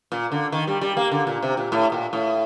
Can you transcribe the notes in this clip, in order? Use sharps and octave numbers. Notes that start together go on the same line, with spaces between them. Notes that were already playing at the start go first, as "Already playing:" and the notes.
A#2
D3
D#3
G3
G3
A#3
D3
A#2
C3
A#2
A2
A#2
A2